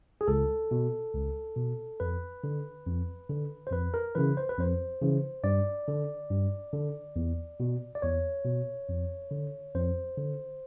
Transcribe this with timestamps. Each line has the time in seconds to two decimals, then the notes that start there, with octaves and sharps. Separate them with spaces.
0.21 G#4
0.28 C#2 A4
0.71 B2
1.14 C#2
1.57 B2
2.00 F2 B4
2.44 D3
2.86 F2
3.29 D3
3.67 C5
3.72 F2 B4
3.94 A#4
4.15 C#3 E3 B4
4.37 C5
4.49 B4
4.58 F2 C5
5.01 C#3 E3
5.44 G2 D5
5.88 D3
6.31 G2
6.73 D3
7.16 E2
7.60 B2
7.95 D5
8.02 E2 C#5
8.45 B2
8.89 F2
9.31 D3
9.75 F2 C5
10.17 D3